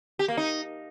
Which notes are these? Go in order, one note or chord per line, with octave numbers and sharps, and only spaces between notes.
G4
A#3
D#4